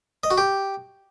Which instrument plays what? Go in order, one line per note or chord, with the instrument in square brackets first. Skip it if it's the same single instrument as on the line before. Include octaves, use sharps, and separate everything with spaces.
[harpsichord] D#5
F#4
G4